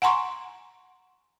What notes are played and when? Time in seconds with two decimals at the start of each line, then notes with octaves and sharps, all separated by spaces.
0.02 F#5 G#5 A#5 C6 C#6